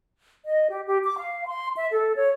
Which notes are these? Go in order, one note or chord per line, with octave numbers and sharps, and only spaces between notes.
D#5
G4
G4
D6
F5
C6
E5
A4
C#5